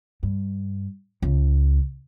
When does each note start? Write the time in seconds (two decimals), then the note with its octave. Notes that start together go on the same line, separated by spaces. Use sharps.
0.23 G2
1.22 C#2